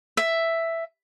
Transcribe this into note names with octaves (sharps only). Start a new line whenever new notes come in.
E5